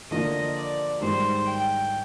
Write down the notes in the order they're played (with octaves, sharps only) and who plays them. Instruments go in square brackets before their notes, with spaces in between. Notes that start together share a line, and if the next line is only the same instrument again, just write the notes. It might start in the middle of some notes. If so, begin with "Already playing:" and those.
[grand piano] D3 F3 A#3 F4 [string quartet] D#5
[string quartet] D5
[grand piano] G#2 D#3 G3 [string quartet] C5
[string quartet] G5